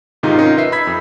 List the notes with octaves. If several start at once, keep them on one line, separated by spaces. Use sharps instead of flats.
G#2 C3 D#3 D#4 F4
C#4 D#4 F4 A#4
B4 D#5 E5 C7
B5 E6 G#6 B6
F2